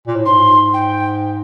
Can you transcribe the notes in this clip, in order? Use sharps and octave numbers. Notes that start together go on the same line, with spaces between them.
A#2
A2
G#2 C6
G5